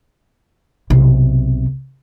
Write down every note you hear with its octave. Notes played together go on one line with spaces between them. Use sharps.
B1 C3